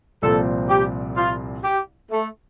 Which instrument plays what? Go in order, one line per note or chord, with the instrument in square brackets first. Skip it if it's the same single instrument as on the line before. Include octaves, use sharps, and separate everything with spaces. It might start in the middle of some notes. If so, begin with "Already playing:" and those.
[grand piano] C2 A#2 F3 C4 [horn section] A4
[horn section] G4
F4
G4
A3